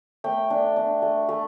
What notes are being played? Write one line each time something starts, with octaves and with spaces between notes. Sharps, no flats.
A3 G5
D4
D4
A3
A3